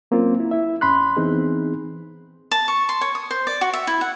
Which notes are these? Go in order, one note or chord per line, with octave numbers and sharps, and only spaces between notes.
F#3 A#3 C4 C#4 F4
E4
E4 E5
F2 C#4 B5 C6 F#6
E3 B3 C4 D#4 G#4
A5
C#6
C6
C#5
D#6
C5
D5
F#4
E5
E4
F#5